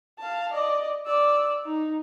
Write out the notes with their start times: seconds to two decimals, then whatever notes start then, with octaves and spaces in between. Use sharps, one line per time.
0.19 F5 A5
0.53 D5 D#5
1.06 D5 E6
1.65 D#4